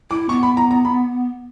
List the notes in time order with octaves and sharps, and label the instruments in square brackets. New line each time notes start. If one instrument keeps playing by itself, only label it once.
[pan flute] E4 [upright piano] D6
[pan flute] B3 [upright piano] C#6
[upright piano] B5
A#5
A#5
B5